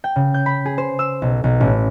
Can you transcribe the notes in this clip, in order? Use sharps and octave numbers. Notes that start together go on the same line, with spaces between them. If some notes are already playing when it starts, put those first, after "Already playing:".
G5
C#3
G6
B5
G#4
C5
E6
B1
B1
A1